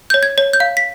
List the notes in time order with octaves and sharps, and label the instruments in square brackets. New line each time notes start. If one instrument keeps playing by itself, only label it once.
[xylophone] C#5 G6
G#6
C#5
G6
F5
B6